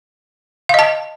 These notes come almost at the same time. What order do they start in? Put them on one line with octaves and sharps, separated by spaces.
F5 D#5 A5